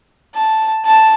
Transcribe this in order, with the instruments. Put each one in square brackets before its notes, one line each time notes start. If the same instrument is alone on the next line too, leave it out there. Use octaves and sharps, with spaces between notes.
[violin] A5
A5